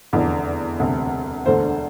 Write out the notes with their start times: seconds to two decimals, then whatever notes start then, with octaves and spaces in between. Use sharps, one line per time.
0.13 F1 E2 D3
0.80 E1 D2 C3
1.46 E1 D2 D3 A3 C5